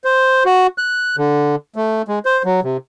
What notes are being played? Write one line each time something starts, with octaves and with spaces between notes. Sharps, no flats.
C5
F#4
F#6
D3
A3
G#3
C5
F#3
C3